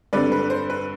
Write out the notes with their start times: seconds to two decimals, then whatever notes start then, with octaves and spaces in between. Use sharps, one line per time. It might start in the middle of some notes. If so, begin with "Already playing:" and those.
0.13 G2 D3 G3 C4 B4 D5
0.32 B4
0.50 C5
0.70 B4